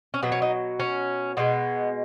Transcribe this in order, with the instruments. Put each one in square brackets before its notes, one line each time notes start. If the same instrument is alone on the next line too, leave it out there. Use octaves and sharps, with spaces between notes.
[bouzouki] C#4
B2 F#3 B3
C#4
D#4
C#4
B2 G#3 B3